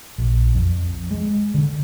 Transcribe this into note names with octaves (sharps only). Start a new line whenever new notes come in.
A#1
F2
G#3
D3